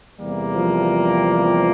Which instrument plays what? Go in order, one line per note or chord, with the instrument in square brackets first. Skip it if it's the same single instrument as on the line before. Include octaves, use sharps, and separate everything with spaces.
[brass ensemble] E2 C3 G3 A#3
[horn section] F3